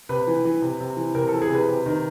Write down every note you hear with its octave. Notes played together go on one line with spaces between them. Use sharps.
C3 B4
E3
E3
C3
C3
E3
C3 A#4
E3 A4
G#4
C3 B4
C3
D#3